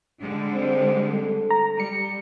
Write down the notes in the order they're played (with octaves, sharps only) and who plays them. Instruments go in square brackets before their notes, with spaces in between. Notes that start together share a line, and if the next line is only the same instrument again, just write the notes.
[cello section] D3 G3 G#3
[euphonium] C4
A4
[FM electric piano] A#5
[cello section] G3 [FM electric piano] C#7